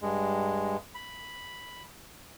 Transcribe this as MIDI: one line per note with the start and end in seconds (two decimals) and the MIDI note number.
0.02 0.77 43
0.02 0.77 56
0.95 1.83 83